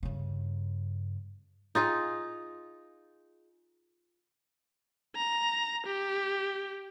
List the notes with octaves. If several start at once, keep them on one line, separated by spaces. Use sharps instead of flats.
G2 C#3
D#4 F4 G#4
A#5
G4